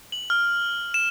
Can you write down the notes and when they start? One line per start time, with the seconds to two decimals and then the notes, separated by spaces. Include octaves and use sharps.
0.12 F#7
0.30 F6
0.94 E7